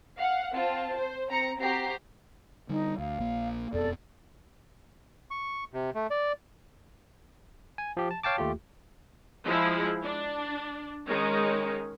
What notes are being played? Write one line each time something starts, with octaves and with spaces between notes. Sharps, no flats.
F5 F#5
C4 F4 A5
C5
C4 A#5 C#7
C4 F#4 G4 A#5 C7
D3 G3 D#4
D2 F5
A#1 A#3
E1 F2 B3 A4 D5
C#6
C3
A3
D5
G#5
F3 G4
A5
C#5 F5 G5 A5 D6
D#2 A3 F4 G4
F3 G#3 E4
D4
D#3 G#3 C#4 D#4